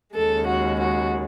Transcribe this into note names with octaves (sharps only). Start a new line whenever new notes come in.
D#2 C#3 G#3 A4
F#4
F#4